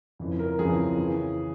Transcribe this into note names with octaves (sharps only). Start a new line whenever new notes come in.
F2 C#3 E3
A#4
F2 C#3 E3 G#4
C#3 E3